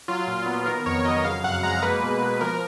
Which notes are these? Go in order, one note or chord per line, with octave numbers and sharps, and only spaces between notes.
F#3 F4
A#2
B3
D#3 A#4
F2 C#5
F#3 D#5
C#3 F5
F#2 F#5
G#3 A#5
A#3 B4
B2
B2
F3 A#4